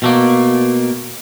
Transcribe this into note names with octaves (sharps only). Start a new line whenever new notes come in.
B2 A3 A#3